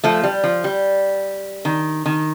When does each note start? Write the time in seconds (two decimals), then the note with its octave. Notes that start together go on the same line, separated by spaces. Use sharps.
0.04 F3 A3
0.23 G3
0.44 F3
0.64 G3
1.65 D#3
2.06 D#3